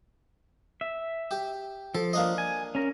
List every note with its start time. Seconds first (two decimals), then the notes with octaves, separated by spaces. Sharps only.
0.81 E5
1.31 G4
1.95 F3 A4
2.13 A#3 D4 D#5
2.38 G#5
2.75 C#4 A#4